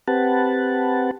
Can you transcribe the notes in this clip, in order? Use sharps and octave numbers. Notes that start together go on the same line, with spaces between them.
C4 G4 B4 F#5 A5